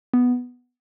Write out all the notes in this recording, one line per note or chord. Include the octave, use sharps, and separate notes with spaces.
B3